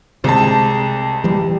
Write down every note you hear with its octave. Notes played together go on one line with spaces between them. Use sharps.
C2 C3 G#3 A5
E3 G3 G4